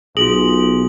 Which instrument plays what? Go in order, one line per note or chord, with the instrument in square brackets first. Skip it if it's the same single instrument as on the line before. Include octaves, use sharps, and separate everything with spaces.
[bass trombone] B1 [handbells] F4 G#4 [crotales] F#7